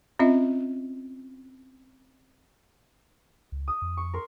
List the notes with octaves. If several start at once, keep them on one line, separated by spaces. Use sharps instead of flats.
C4 C#4 F4 D#5 E5
C#2
D#6
F2
C#6
A#4 C6